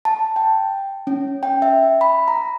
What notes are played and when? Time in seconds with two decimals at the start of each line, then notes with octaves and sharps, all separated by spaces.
0.05 A5
0.36 G5
1.07 C#4
1.43 G5
1.62 E5
2.01 B5
2.28 A#5